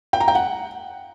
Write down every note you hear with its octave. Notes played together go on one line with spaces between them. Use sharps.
G5
A#5
G5
F#5